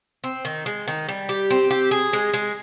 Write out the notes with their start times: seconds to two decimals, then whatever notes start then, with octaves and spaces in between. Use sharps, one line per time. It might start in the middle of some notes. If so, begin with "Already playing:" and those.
0.24 C4
0.45 D#3
0.66 G#3
0.88 D#3
1.09 G3
1.29 G4
1.50 C4
1.71 G4
1.91 G#4
2.13 G#3
2.34 G#3